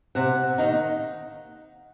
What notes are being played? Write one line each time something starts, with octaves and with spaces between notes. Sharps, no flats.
C3 F#5
D#3 A#3 D#4